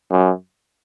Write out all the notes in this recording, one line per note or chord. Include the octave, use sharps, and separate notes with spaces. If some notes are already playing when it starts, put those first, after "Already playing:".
F#2